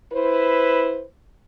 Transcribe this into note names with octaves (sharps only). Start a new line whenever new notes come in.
E4 B4 C5